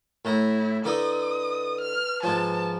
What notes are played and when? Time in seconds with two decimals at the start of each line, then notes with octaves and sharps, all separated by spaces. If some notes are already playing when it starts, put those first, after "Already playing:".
0.25 A2 E4 A#5
0.85 D3 D#4 E4 B4 D#6
1.81 F6
2.23 G#2 F3 A5